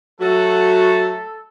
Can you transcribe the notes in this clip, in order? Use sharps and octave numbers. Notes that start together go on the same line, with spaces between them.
F#3 A3 F#4 A4